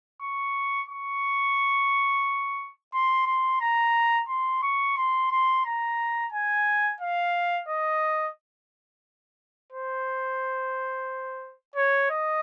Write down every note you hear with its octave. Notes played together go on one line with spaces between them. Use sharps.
C#6
C#6
C6
C6
A#5
C6
C#6
C6
C6
A#5
G#5
F5
D#5
C5
C#5
D#5